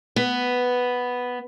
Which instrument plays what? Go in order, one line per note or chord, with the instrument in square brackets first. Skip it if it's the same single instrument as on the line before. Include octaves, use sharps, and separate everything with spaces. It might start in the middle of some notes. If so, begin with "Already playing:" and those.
[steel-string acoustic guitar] B3